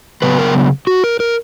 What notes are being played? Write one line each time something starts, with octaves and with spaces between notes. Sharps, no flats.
C#3 F#3 B3 B4
A#4
F#4
A#4
A#4